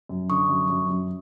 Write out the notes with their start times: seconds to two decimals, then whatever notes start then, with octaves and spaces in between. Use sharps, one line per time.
0.09 F#2
0.30 D3 C#6 D#6
0.49 F#2
0.70 F#2
0.90 F#2